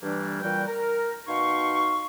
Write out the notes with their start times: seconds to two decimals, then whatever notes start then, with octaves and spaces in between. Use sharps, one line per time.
0.02 G2 E3 G3 A3 A#3 D4
0.42 A#2 E3 G3 F#4 G5
0.67 A#4
1.28 B2 D#4 F5 C6 C#6